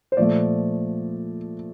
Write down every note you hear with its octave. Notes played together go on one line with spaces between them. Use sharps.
C5
A#2 F3 A3 D5